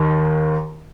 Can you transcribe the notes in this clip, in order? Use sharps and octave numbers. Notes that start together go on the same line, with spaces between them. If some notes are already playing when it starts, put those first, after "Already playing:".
Already playing: D#2 D#3